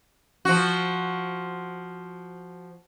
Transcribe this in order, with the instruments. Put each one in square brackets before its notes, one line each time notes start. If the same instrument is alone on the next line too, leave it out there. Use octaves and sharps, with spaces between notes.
[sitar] F3 F#4